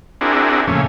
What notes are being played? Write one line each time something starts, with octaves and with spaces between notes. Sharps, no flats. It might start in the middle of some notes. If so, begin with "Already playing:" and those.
C4 D4 E4 F#4 G#4 A#4
F2 A#2 C#3 A3 C#4